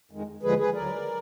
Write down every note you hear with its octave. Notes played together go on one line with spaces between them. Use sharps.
F2 D#3 G#3
D#2 D3 F3 G#3 G#4 B4
G#4 B4
D2 D3 F#3 A#4 D5